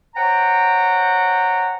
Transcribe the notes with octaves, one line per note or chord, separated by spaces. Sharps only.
C5 C#5 F#5 G5 A#5